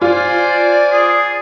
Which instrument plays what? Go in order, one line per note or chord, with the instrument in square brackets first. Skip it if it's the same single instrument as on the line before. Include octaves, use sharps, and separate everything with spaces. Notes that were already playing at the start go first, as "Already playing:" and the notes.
[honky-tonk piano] F4 [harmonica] C5 G#5 [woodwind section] D5
[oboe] G#4